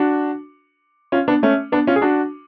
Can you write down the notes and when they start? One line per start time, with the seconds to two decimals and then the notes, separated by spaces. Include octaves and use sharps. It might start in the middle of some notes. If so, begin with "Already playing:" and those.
Already playing: D4 F#4
1.12 C#4 F4
1.28 B3 D4
1.43 A3 C#4
1.72 B3 D4
1.87 C#4 F4
1.96 G#4
2.02 D4 F#4